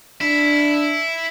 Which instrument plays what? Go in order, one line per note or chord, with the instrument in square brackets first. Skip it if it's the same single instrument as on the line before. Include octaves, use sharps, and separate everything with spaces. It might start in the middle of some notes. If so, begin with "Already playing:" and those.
[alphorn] D4 [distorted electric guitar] E4